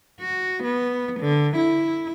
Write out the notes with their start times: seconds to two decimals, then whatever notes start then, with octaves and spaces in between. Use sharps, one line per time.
0.22 F#4
0.63 B3
1.19 D3
1.56 E4